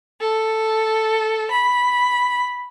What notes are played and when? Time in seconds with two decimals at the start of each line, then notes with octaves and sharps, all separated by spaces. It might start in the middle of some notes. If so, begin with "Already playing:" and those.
0.20 A4
1.51 B5